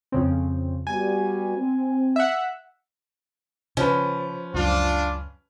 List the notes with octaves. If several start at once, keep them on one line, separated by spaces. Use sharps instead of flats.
F2 C#3 C4
G3 B3 F#4 G#5
C4
E5 F#5
C#3 F3 C#4 B4
C#2 F#2 D4 F4